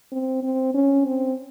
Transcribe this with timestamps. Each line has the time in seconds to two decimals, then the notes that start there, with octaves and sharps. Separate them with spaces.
0.12 C4
0.43 C4
0.74 C#4
1.06 C4